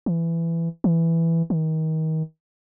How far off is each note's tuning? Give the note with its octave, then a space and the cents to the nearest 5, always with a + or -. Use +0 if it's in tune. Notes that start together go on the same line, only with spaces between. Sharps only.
E3 +15
E3 +5
D#3 +30